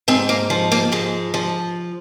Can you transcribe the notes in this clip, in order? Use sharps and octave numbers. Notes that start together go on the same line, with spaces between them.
G#2 C4
A#3
F3
A#3
G#2 G#3
F3